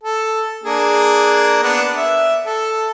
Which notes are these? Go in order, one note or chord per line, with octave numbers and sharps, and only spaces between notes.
A4
A#3 D4 G#4
B3 D4
E5
A4